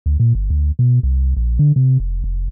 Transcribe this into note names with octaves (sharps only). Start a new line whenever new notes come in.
D2
A#2
G1
D2
B2
C2
A#1
D3
C3
F1
F1